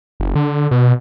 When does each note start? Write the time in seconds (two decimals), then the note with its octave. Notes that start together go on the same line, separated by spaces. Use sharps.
0.20 F#1
0.35 D3
0.71 B2